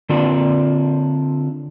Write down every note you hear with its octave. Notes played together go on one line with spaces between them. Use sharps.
D3 C4 D4 F4